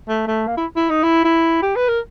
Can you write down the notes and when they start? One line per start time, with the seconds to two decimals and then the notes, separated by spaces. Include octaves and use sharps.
0.08 A3
0.27 A3
0.47 A#3
0.57 E4
0.76 E4
0.90 D#4
1.03 E4
1.25 E4
1.62 G4
1.76 B4
1.88 A#4